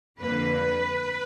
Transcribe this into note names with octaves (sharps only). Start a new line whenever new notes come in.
F2 D3 G3 A#3 B4